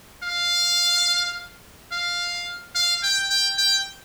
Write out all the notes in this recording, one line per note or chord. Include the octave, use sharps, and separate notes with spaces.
F5
F5
F5
G5
G5
G5